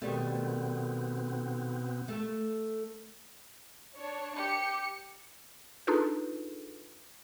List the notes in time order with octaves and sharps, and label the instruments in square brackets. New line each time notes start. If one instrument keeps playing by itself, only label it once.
[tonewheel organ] B2 B3 C4 [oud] D#3 G3 A3
[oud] A3 A4
[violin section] D4 C#5
[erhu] G4 [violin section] C#7
[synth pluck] D4 D#4 F4 G#4 A4 B4